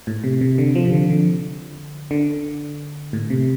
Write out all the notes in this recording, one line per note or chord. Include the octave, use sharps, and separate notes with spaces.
A2
C3
C3
D3
F3
C3
D3
D3
D3
A2
C3